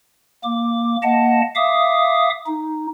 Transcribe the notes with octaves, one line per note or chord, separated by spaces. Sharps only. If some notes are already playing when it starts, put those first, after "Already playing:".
A#3 D6
A#3 D#5 F#5 A5
E5 F5 D6 D#6
D#4